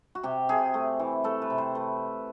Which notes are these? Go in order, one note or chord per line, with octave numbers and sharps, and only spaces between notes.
F#4
C3 G4
C3 G#4
A3
E3
A3 A4
B4
C3
C5
A3 B4